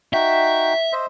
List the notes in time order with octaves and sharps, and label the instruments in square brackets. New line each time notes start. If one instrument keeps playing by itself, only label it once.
[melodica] D#4 F#4 G5 [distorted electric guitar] E5
[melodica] C5 D#5 E5